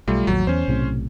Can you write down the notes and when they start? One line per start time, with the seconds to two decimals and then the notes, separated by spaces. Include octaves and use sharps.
0.08 B1 G3 A3 F4
0.27 A1 D#2 F#3
0.47 E2 C#4 C5
0.68 B1 A2 C3